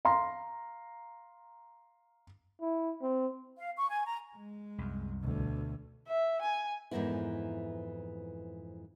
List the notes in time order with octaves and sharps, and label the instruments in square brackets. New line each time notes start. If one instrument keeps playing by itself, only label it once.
[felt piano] F5 A#5 C6
[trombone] E4
C4
[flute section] F5
C#6
G#5
A#5
[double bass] G#3
[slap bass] C2 F#2
[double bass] D2 B2
[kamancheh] E5
G#5
[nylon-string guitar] F2 G#2 E3 A#3 B3 E4